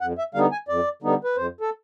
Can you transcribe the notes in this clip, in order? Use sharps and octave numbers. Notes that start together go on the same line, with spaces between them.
F2 F#5
E5
D3 G3 B3 D#4 F5
G#5
F2 D5
D3 G3 B3 D#4
B4
F2 C5
A4